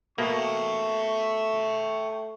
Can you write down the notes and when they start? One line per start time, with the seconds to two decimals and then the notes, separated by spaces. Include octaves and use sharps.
0.18 B2 A3 A#3 E5 G5 C#6